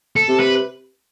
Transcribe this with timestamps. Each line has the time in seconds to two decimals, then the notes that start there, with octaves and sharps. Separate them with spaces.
0.16 A4
0.28 C3
0.40 B4